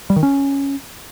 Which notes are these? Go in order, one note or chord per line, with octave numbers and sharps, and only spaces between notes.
G3
D#3
C#4